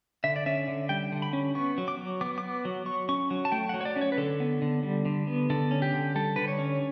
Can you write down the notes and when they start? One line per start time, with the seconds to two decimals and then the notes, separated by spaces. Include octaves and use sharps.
0.24 D3 E5
0.36 D5
0.46 C#4 E5
0.68 D3
0.89 G3 G5
1.12 D3
1.22 B5
1.33 C#4
1.55 B3 C#6
1.78 F#3
1.88 D6
1.99 F#3
2.21 B3 D6
2.38 D6
2.43 B3
2.65 F#3
2.86 F#3 C#6
3.09 C#4 C#6
3.30 F#3
3.45 A5
3.52 A3 G5
3.69 F#3 F#5
3.81 C#5
3.85 D5
3.96 C#4
4.01 C#5
4.12 B4
4.17 D3 A4
4.40 B3
4.62 D3
4.83 G3
5.05 D3
5.27 B3
5.50 D3 A4
5.71 C#4
5.82 G4
5.93 D3
6.16 G3 A4
6.36 D3 B4
6.48 C#5
6.59 C#4